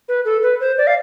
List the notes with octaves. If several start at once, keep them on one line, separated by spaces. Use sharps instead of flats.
B4
A4
B4
C5
D5
F5